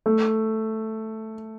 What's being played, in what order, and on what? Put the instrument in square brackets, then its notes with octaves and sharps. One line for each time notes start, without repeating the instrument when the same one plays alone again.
[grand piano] A3